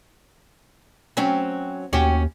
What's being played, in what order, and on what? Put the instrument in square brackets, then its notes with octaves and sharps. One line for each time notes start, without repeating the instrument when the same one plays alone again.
[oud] F#3 C4 C#4
[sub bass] D#2 [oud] C#4 F#4 G4